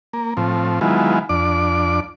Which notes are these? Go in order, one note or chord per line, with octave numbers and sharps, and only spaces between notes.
A#3
A2 F3 C4
D#3 F#3 G#3 B3 E4 F4
F2 D4 D5 D6